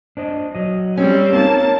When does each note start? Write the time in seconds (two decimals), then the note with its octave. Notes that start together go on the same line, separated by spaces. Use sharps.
0.17 D4 C5 D#5
0.55 F#3 D#5
0.97 G3 C4 C#4
1.33 A#3 C4 D#4 A5